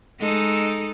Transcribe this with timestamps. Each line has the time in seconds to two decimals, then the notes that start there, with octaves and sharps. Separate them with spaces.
0.20 G#3 D#4 A4